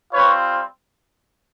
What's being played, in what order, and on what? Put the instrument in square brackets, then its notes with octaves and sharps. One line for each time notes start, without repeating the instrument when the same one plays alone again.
[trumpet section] G3 C4 F4 B4 C#5